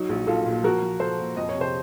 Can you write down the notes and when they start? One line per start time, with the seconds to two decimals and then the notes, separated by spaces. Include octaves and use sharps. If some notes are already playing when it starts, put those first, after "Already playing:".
Already playing: F#3 D#4
0.09 A#1
0.27 A#1 F4 A4
0.46 A#2
0.64 F3 F#4 A#4
0.82 F3
1.00 F3 A4 C5
1.18 A#2
1.37 F2 D#5
1.49 C#5
1.55 C3
1.61 C5